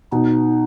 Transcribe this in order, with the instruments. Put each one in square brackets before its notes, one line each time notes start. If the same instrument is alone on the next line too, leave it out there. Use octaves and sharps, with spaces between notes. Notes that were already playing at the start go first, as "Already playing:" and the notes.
[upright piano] B2 [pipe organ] D#4